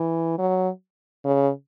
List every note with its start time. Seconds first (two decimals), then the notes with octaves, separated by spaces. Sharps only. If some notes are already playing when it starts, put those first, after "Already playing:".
Already playing: E3
0.39 F#3
1.24 C#3